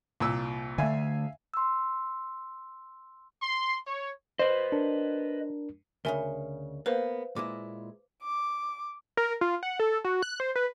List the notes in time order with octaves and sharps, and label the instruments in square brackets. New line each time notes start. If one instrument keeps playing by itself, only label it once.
[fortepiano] C2 A#2 E6
[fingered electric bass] D3 A3 [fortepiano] E5 F5 G#5
[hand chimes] C6 E6
[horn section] C6
C#5
[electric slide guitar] B4 D#5 [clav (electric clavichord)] C5
[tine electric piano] D4 A#4
[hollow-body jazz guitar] D2 A2 C#3 [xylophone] A#4 E5 G#5
[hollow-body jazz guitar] A#3 B3 [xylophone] B4 C5 F5
[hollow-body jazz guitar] A#2 G#3 E4 [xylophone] D6
[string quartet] D6
[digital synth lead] A#4
F4
F#5
A4
F#4
F#6
C5
B4